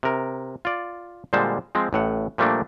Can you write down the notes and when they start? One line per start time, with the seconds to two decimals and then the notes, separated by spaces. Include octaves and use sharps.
0.03 C3 A#4
0.65 F4 D5
1.33 A#2 D3 G3 G#3 C5 A5
1.75 F3 G#3 C4
1.93 A1 A2 F#5
2.38 A#2 F3 G3 A3 A#3 D4